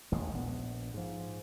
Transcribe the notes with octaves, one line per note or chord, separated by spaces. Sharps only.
A1 D#2 G#3
A#1 B3
G#2 F3